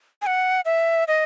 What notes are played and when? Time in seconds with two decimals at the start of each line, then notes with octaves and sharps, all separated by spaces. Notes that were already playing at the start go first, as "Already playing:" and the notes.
0.22 G#5
0.27 F#5
0.65 E5
1.08 D#5